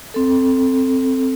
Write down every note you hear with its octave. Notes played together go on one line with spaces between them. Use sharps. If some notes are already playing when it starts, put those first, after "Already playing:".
C4 A4